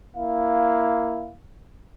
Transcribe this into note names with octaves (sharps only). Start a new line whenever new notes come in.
A#3 E4 F5